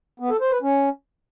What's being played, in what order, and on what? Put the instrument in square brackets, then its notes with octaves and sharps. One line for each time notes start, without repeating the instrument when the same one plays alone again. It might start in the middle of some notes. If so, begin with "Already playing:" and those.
[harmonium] B3
A4
C5
B4
C#4